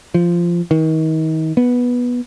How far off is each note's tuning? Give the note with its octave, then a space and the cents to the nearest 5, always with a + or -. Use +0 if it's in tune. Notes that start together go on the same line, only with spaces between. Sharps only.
F3 -15
D#3 +35
B3 -10